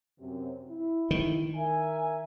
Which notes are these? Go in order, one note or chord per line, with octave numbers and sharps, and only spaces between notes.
F#2 C3
E4
D#3
A#4 E5 G#5